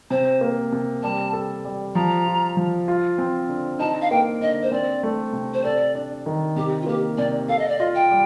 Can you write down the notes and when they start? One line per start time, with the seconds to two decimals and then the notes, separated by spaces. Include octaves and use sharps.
0.10 C3 C5
0.41 A#3
0.72 C3
1.03 G3 A5
1.33 A4
1.65 G3
1.95 F3 A#5
2.26 F4
2.57 F3
2.88 F4
3.18 C4
3.49 D3
3.79 D#4 A5
4.02 F5
4.11 A#3 G5
4.41 D3 D#5
4.63 C5
4.72 C4 D5
5.03 A3
5.33 C3
5.54 C5
5.64 A4 D5
5.95 D4
6.26 D#3
6.56 C3 G4
6.81 F4
6.87 A#3 G4
7.18 C3 D5
7.49 A4 F5
7.59 D#5
7.68 D5
7.78 F4 D#5
7.95 G5
8.11 G3